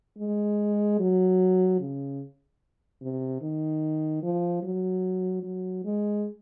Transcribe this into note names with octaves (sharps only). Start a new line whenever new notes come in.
G#3
F#3
C#3
C3
D#3
F3
F#3
F#3
G#3